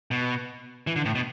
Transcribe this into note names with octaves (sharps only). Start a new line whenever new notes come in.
B2
E3
D3
A2
B2